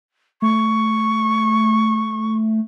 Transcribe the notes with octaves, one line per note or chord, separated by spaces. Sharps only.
A3 C#6